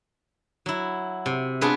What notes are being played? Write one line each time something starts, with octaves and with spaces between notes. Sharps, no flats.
F#3 E4
C3
B3 D4 F4 G#4 B4